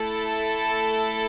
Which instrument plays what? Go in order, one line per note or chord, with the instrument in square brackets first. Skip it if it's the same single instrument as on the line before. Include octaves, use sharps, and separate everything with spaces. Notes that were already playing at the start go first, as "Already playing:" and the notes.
Already playing: [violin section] A3 E4 A4